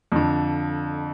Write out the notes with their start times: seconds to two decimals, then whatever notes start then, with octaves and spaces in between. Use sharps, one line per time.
0.12 F2 D3